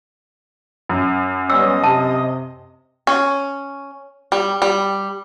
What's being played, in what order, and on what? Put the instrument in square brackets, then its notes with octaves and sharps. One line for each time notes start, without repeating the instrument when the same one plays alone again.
[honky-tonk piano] F#2
[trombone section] G3 B3 C#4 [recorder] D#5 [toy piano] E6
[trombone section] C3 [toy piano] A5
[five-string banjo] C#4
G3
G3